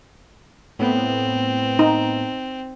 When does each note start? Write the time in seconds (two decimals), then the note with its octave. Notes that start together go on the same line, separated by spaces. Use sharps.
0.79 A2 B3 C4
1.79 D#4